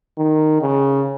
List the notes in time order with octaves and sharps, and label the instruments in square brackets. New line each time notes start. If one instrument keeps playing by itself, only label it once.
[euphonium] D#3
C#3